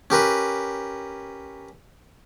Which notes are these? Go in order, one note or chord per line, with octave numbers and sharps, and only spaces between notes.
C#4 G4 A#4 B4